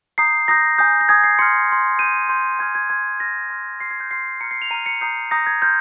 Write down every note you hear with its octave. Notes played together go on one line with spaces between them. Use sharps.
A#5 D#6 G6 C7
A#5 D#6 G6 A#6
G#5 D#6 G6
A#6
G#5 D#6 G6 G#6
C7
C6 F6 C#7
C6 F6
C6 G6 D#7
C6 G6
G#5 C6 F6 G#6
G#6
G#5 C6 F6 G#6
C6 F6 A#6
C6 F6
C6 F6 C7
G#6
G6
C6 F6 C7
A#5 F6 C#7
C7
F7
A#5 F6 D#7
C#7
A#5 D#6 G6 C7
A#5 D#6 G6 A#6
G#6
C6 F6 G6